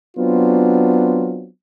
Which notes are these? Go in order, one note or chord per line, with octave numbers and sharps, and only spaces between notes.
F#3 B3 C4 D4 F4